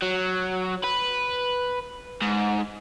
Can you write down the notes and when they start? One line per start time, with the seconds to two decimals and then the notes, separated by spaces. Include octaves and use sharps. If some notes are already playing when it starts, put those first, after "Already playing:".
0.02 F#3
0.83 B4
2.22 G#2